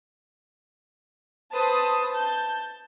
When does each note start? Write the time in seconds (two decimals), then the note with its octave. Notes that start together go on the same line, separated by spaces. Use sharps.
1.52 B4 C5 A5 D#6
2.12 A5 G6